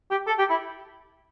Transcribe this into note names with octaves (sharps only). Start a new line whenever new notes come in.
G4
A4
G4
E4